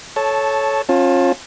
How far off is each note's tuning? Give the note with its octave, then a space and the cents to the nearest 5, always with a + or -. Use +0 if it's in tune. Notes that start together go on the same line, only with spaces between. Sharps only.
A4 -20 C#5 +0 A5 +0
C#4 -35 F4 +15 A5 +0